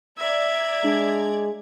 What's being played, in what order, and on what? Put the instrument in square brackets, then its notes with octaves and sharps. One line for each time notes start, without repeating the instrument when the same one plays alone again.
[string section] D5 A#5 G#6 [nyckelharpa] E5
[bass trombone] G#3 [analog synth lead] D4